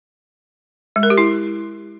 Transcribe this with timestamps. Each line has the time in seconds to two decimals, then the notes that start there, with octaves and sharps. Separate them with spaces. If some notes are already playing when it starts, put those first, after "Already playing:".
0.96 G#3
1.03 A#4
1.10 G4
1.18 E4